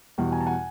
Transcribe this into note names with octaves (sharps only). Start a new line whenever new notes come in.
E2 B2 G3
G#5 A#5
A5
F#5 G#5